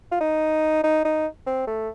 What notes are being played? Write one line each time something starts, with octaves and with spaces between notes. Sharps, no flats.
F4
D#4
D#4
D#4
C4
A3